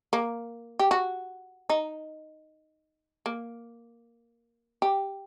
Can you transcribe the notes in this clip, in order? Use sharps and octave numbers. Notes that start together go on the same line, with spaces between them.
A#3
G4
F#4
D#4
A#3
G4